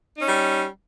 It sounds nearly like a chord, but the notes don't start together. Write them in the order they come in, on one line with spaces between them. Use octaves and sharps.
D#4 C#4 G3